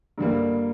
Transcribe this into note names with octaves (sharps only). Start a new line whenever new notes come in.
G2 D3 G3 A#3